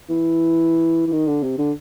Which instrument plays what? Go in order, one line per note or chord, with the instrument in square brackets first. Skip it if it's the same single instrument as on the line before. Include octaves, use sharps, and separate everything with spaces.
[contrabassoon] E3
E3
D#3
D3
C3
D3